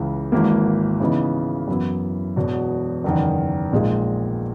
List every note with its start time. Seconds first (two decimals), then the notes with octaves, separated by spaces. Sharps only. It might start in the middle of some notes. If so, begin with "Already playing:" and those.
Already playing: C#2 C#3 E3
0.32 G#1 G#2 E3 A#3
1.00 C#3 E3 B3 D#4
1.68 F#2 E3 B3 E4
2.36 E1 E2 B2
3.04 F#1 E2 D#3
3.72 A#1 A#2 G#3 D#4